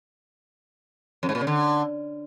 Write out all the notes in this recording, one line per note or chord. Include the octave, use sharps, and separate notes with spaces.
F2
G#2
A#2
C#3
D3